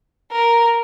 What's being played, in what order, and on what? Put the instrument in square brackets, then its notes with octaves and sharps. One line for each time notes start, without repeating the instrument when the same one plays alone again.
[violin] A#4